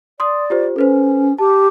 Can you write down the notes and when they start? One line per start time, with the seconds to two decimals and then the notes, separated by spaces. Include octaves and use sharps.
0.20 D5 C6 D#6
0.50 F4 G4 C5
0.76 C#4 A4 B4 C5
1.39 G4 A5